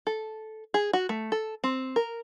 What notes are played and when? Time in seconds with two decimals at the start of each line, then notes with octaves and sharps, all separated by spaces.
0.07 A4
0.74 G#4
0.93 F#4
1.09 A3
1.32 A4
1.64 C4
1.96 A#4